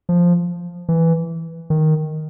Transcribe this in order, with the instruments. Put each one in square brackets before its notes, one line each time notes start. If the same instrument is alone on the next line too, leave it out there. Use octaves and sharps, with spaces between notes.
[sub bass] F3
E3
D#3